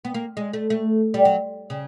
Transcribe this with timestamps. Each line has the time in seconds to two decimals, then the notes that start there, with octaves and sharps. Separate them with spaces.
0.05 B3
0.14 A#3
0.37 G#3
0.53 A3
0.70 A3
1.14 G3
1.25 F#3
1.70 C#3